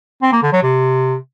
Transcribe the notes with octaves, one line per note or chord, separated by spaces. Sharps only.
C4
A#3
D3
F#3
C3